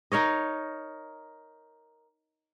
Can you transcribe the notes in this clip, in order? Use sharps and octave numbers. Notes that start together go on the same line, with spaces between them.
D#4 A#4 C#5 D#5